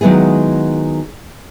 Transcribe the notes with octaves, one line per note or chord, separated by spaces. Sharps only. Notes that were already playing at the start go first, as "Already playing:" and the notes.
D#3 F#3 G#3 B3 E4 G#4